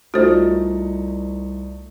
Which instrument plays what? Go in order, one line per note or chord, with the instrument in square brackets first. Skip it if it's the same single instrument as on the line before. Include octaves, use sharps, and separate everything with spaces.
[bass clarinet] C2 [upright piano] A3 D#4 [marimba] F4 [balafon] F#4 C5